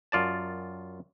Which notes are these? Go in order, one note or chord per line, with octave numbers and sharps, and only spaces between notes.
F#2 F4 D5 A5